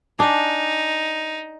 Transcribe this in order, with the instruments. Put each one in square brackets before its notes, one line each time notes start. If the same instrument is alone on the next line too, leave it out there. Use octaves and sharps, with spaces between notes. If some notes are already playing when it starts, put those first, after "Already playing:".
[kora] D4 G#4 [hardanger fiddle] D#4